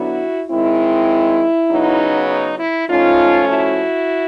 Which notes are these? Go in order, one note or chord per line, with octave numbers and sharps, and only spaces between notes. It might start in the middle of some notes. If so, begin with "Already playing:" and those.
Already playing: D3 F#3 B3 D4 E4 F#4
D#3 G#3 C4 E4
C#3 F#3 B3 D#4
D#4
E4
F3 A3 C#4 D#4 F4
E4 F#4